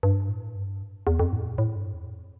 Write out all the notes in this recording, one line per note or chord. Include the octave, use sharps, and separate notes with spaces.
G2
A2
G2
E2
F2
A2
A#2
A2
G2
E2
F2